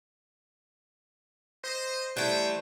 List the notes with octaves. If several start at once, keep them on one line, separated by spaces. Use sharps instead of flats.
C5 D#5
E3 G3 A3 C5 G5